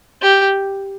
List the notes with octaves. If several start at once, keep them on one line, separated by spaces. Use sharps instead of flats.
G4